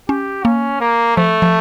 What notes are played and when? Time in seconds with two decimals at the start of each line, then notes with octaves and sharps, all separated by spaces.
0.09 C#4 G4
0.44 A#3 C#4
0.81 A#3
1.17 F3 A3
1.42 F3